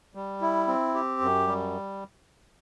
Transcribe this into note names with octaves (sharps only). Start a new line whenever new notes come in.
G3
E4
C4
G4
F#2
G3